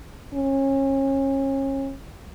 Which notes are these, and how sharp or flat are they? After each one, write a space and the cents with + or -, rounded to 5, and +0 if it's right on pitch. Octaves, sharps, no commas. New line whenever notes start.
C#4 -30